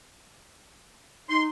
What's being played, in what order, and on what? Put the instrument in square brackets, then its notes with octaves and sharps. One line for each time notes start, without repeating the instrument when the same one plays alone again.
[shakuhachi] D#4 [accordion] C6